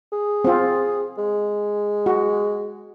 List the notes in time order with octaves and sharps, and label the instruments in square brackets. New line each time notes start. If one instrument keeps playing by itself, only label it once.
[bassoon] G#4
[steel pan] C4 F4
[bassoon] G#3
[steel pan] F#4